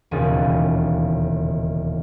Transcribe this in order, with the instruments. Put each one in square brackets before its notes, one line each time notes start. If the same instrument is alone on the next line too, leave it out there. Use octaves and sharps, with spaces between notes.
[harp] E1 D#2 A#2 C#3 G#4 A6